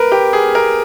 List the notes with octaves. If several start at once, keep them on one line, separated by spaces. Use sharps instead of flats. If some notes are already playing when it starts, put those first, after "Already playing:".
Already playing: A#4 B4
G4
G#4
A#4